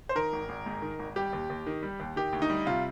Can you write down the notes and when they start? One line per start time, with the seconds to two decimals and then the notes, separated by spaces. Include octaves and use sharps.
0.09 C5
0.15 D#3 A#4
0.33 G#1
0.49 G#1
0.66 G#2
0.82 D#3
0.99 G#1
1.16 G3 G4
1.33 D#2
1.50 D#2
1.67 D#3
1.83 G3
2.00 D#2
2.16 D#3 G4
2.33 D2
2.42 D#4
2.50 G3
2.66 C3 F4